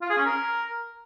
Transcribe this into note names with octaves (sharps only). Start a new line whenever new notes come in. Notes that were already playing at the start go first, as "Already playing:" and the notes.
F4
G#4
C#4
A#4